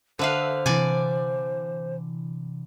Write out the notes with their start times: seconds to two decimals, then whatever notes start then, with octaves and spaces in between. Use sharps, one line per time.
0.19 D3 A4 B4 C5 E5 F5
0.66 C3 E3 D5 G#5